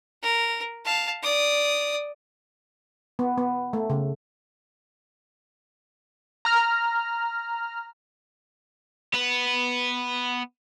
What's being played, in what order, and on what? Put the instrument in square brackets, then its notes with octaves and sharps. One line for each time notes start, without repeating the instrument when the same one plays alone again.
[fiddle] A#4
F5 A5
D5 D#6
[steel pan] B3
B3
A3
C#3
[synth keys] A#5 F6
[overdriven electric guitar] B3 B4